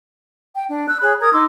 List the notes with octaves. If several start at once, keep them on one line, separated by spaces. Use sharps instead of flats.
G5
D4
E6 F#6
G#4 C#5 B5 F#6
A#4 A#5 D#6 G#6
D#4 C6 D6 E6